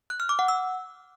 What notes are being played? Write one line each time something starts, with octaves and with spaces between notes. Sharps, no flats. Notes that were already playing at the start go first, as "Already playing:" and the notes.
F#6
F6
D6
F#5
E6